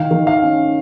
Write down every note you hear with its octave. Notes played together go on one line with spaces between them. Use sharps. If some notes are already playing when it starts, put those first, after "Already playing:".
Already playing: D#3 F5
D#3
F5
C#4